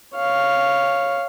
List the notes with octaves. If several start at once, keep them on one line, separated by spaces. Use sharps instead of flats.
C#5 F5